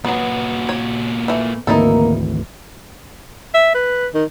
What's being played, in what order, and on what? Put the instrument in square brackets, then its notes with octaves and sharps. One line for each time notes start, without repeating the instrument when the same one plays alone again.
[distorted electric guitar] A#2 F#4 [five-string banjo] F#3 B3
[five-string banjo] C#5
E3 A3
[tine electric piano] G#1 D2 E3 [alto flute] A#3 [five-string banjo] D#4 E4 A4
[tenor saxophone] E5
B4
D#3